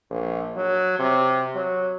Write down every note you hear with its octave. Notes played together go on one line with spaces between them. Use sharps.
A#1
F#3
C3
F#3